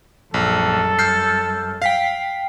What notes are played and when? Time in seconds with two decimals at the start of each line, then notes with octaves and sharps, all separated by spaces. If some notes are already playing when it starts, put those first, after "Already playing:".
0.34 A#1 F#2 G3 A4
0.99 E6 F6 G6 C7
1.82 F5 G5 B6 C7